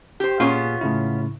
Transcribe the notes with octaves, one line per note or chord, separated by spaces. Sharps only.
G4 C5
A#2 B3 C#4 F4 G#4
A2 C#3 E4